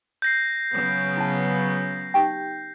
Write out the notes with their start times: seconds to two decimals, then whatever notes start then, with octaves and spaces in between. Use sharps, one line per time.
0.22 G6 A#6 C7
0.74 C#3 F#3 B3
1.17 E4 A5
2.14 D#4 G4 G5